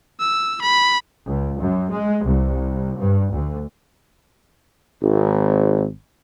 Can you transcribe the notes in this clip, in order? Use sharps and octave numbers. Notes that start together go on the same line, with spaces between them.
E6
B5
C#2
F#2
G#3
C2
G2
D2
G#1